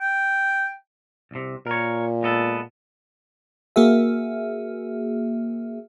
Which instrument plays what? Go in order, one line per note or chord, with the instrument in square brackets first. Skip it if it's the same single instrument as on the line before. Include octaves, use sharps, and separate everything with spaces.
[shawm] G5
[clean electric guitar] C2 C3
[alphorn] A#2 [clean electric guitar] A#4 C#5
[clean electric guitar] G#3 B3 A4
[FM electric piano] A#3 F#4 G#4 E5